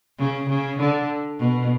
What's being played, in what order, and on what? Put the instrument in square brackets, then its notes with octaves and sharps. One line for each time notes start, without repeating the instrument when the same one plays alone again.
[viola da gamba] C#3
C#3
D3
B2